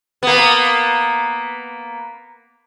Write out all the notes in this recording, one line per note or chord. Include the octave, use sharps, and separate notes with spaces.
A#3 B3